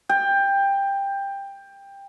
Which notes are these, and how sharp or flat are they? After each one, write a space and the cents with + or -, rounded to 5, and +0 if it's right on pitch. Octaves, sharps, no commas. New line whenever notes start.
G5 +15